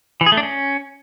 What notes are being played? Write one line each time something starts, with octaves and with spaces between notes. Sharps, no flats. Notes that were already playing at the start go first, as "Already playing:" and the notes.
E3
G#4
A3
D4
C#4